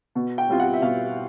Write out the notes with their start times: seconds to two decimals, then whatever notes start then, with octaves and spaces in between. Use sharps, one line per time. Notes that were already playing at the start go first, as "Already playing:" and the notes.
0.15 B2
0.38 G5
0.49 G3 C4 F4
0.60 F#5
0.74 E5
0.82 B2 F5